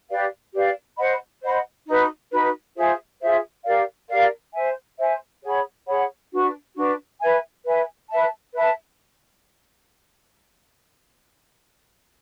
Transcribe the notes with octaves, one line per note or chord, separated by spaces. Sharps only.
G4 B4 D5 F5
G4 B4 D5 F5
C5 D#5 F#5 B5
C5 D#5 F#5 B5
D#4 F#4 B4
D#4 F#4 B4
F4 G#4 C5 E5
F4 G#4 C5 E5
G4 A#4 D5 F5
G4 A#4 D5 F5
C5 E5 G#5
C5 E5 G#5
G#4 C#5 F#5 B5
G#4 C#5 F#5 B5
D4 F#4 B4
D4 F#4 B4
B4 E5 G#5
B4 E5 G#5
B4 E5 A5
B4 E5 A5